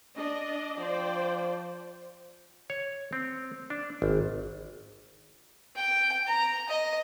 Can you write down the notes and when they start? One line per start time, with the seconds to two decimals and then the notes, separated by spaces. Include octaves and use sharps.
0.18 D4 D#5
0.79 F3 C5 D5 G5
2.70 C#5
3.13 C4
3.70 D4
4.02 G#1
5.75 G5
6.27 A#5
6.68 D#5